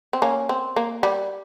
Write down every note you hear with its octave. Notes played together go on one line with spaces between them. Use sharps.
C4
A#3 C#4
C4
A#3
G3